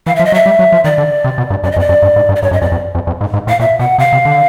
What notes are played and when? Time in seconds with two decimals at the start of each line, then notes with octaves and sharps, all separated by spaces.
0.06 E3 F5
0.16 F3 E5
0.25 D#5
0.32 F#3 E5
0.46 G3
0.59 F#3
0.72 F3
0.84 D#3 D5
0.98 D3
1.24 C3
1.38 B2
1.50 G2
1.63 F#2 D5
1.72 D#5
1.76 F2
1.80 D5
1.89 F#2
2.02 G2
2.16 G#2
2.29 G2
2.36 D5
2.42 G2 C#5
2.51 F#2 D#5
2.62 F2 D5
2.72 F2
2.95 F2
3.07 F2
3.21 G#2
3.34 G#2
3.47 A2 F5
3.60 A#2 E5
3.79 B2 F#5
3.98 C3 F5
4.13 C3
4.25 D3